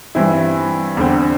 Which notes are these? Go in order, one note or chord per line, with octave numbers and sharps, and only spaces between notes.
G2 E3 C4 E4
E2 D3 C4